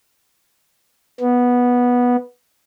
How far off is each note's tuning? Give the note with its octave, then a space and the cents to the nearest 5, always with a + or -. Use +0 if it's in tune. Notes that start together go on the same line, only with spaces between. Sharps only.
B3 -10